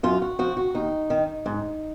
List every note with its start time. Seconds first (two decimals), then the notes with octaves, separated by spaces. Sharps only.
0.03 F#2 F4
0.22 F#4
0.39 F3 F#4
0.57 F#4
0.75 D#2 D#4
1.10 D#3
1.46 G#2